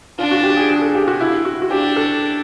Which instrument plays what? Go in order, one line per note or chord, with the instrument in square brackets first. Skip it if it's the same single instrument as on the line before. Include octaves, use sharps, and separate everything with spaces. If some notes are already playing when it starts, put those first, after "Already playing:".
[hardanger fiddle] D4 [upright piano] F4
[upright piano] F#4
G4
G#4
G#4
A4
G4
F#4
E4
F#4
F#4
[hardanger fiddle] D4 [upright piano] G4
[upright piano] A4